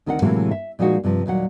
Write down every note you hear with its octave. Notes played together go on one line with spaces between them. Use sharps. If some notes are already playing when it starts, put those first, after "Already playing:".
D2 D#3 C4 A#4 F5 F#5
A2 C3 E3 F#3 G#3 A#3
E5
A#2 F3 G#3 D#4 F#4
G2 C3 F3
D#2 A#2 F#3 F#5